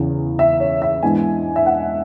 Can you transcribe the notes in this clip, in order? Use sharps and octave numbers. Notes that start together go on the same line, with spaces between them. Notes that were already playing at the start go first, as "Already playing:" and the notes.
Already playing: E2 C#3 E3
E5
C#5
E5
G#2 E3 B3 D4 G#5
E5
F#5